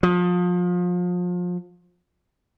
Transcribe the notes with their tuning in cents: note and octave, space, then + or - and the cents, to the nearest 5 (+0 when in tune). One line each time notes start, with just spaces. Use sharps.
F3 +30